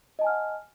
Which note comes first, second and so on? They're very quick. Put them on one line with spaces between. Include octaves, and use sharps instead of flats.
D#5 A5 G#5 F6 F#5